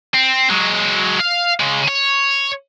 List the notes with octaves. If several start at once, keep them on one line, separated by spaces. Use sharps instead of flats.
C4
F#3 G#3
F5
C#3 G#3
C#5